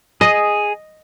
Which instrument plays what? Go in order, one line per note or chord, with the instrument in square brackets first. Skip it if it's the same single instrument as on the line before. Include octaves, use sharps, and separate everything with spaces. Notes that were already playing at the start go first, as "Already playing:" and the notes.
[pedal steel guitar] G#4 [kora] D#5